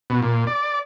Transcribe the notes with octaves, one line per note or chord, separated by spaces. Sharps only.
B2
A#2
D5